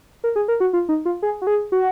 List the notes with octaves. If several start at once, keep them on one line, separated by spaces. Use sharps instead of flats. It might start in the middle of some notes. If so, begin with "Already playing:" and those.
A#4
G#4
A#4
F#4
F4
D#4
F4
G#4
F#4
G#4
F#4